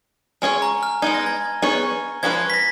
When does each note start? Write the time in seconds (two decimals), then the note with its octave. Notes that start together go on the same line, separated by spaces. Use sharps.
0.42 G#3 C#4 G#4 C#5 G#5
0.62 A#5
0.83 F6
1.02 G#3 B3 D#4 G#6
1.14 A#6
1.26 G#6
1.62 B3 D#4 G#4 C#5
2.23 F3 G#3 C#4 G#4 B4 G#6
2.50 B6
2.54 A#6